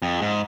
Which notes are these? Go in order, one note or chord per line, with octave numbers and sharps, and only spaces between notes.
F2
G#2